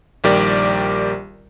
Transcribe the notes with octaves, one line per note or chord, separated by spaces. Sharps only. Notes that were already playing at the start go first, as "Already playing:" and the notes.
A#1 D#3 G3 G4 A#4 D5